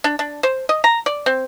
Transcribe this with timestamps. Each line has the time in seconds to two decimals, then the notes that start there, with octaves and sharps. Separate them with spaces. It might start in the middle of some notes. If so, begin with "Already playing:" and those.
0.04 D4
0.19 D4
0.43 C5
0.69 D#5
0.84 A#5
1.06 D5
1.26 C4